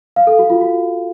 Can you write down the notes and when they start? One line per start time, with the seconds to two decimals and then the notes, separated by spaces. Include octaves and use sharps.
0.16 F5
0.27 A4
0.39 F#4
0.50 F4
0.61 F#4